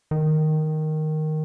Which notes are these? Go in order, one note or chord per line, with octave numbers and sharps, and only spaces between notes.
D#3